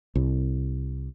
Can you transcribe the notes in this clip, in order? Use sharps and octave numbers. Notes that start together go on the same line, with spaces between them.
C2